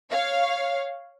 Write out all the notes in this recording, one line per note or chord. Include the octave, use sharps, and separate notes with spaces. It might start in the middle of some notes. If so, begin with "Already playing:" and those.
C#5 F5